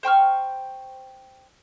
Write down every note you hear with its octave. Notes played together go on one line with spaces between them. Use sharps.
C5 G5 C#6 F6